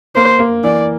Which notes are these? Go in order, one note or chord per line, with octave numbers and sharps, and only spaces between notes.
A#3 C5
A#3
E3 D5